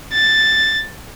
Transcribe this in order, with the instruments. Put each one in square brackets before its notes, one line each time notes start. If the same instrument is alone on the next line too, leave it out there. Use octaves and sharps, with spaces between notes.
[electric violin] A6